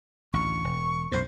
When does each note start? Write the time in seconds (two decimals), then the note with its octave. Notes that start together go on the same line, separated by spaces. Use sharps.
0.33 A1 D2 C#6
0.64 E1
1.12 B1 F#2 A2 C5